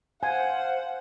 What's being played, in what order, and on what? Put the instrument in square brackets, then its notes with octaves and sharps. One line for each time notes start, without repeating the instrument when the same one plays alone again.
[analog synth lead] C5 [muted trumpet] F5 [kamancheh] F#5 [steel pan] G#5